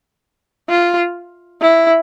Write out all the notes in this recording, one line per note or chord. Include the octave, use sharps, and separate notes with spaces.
F4
E4